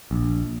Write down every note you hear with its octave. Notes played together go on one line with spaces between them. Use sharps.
A#1